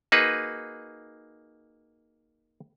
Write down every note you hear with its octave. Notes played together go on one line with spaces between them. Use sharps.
A#3 D#4 F#4 G#4 B4